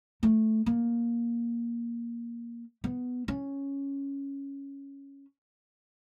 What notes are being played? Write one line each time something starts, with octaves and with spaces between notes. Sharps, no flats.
A3
A#3
B3
C#4